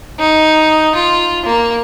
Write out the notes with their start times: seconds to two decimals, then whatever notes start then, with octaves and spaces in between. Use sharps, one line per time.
0.20 D#4
0.95 F4
1.46 A#3